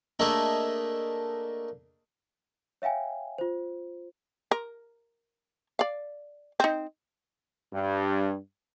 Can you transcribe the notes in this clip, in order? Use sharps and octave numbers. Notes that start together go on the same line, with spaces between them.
A3 A#3 D4 G#4 D#5 E5
C#5 E5 F5 G5 G#5
F4 C5
A#4
D5 F5
C4 D#4
G2